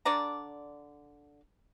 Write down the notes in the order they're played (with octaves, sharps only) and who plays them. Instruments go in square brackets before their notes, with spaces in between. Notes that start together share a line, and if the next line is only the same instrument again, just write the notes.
[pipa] D3 D4 D5 A#5